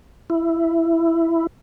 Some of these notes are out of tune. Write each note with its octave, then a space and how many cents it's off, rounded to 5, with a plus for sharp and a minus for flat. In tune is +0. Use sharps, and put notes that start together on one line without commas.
E4 +10